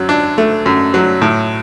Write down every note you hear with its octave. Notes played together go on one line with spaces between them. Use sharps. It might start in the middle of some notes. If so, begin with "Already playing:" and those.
Already playing: F#2 F#3
D4
A3
F#2
F#3
A2